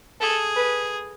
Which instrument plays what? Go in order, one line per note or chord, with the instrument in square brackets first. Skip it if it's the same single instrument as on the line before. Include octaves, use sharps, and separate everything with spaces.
[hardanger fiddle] G#4 [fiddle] A4
[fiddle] B4